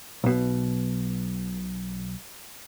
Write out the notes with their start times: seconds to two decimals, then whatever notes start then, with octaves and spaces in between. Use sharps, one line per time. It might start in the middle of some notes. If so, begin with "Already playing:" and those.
0.24 B1 B2